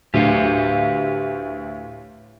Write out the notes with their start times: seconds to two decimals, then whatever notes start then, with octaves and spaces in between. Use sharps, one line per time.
0.14 D2 A2 G4 B4 F5